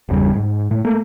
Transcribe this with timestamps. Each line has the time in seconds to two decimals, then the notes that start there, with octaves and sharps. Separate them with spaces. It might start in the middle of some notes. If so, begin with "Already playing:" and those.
0.09 G1 E2 C#3 G3
0.35 G#2
0.71 A2
0.85 A3 A#3